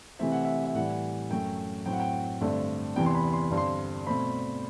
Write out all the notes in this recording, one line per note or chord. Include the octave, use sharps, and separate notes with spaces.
C3 E3 A3 C4 E5
F#5
E5
E5
A2 E3 G3 F#5
F#2 F#3 A3 G5
A2 F#3 C4 G5
F#5
G5
G2 D3 A3 C4
E2 C3 E3 B3 G5
C6
B5
C6
G2 D3 G3 C4
C6
B2 A3 C4 B5